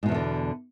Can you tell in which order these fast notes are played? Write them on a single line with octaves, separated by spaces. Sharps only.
G#2 B2 E2 D#3 D3